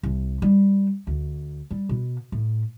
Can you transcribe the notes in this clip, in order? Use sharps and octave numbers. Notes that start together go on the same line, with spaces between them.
C2
G3
D2
G3
B2
A2